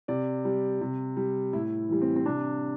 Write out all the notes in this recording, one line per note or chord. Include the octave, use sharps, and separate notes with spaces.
C3 D5
G3
C3
G3
A2 E4
E3 G3
C4
C4
C3 D4